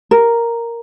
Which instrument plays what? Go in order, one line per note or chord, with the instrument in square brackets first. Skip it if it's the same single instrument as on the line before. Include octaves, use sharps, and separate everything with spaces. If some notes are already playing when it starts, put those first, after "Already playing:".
[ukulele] A#4